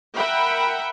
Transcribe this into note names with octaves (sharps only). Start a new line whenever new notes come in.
A#4 E5 F#5 G5 B5